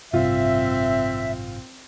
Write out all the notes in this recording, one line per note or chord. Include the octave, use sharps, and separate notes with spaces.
A1 G2 C3 C4 F4 E5